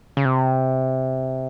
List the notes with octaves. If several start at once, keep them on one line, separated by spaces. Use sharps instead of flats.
C#3
C3